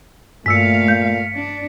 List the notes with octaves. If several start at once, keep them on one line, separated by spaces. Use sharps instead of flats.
G2 A#2 A3 F5 E6 B6 C#7
G6
D4